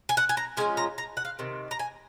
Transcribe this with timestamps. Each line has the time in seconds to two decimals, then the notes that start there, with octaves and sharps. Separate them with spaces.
0.09 G#5
0.17 F#5
0.29 G#5
0.37 A#5
0.57 F3 G#3 C#4 F4 G#5
0.77 A#5
0.98 A#5
1.17 F#5
1.25 F5
1.39 C3 D#3
1.71 A#5
1.79 G#5